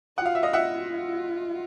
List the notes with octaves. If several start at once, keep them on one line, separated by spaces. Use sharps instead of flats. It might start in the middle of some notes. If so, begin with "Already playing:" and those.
F4 F#5
F5
E5
D#5 F5
F4 E5 F#5